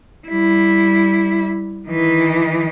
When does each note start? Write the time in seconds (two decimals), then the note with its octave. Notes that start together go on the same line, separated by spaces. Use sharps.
0.28 G3 E4
1.89 D#3 E3